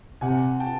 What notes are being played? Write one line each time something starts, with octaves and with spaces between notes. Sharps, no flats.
C3 F#5 G#5
G5 A5